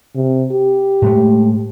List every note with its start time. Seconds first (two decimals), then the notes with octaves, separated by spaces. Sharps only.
0.15 C3
0.52 G4
1.02 A2 G#3 A3